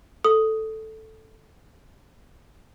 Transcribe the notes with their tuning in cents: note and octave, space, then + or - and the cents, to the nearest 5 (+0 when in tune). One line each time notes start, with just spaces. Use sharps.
A4 +0 D#6 +0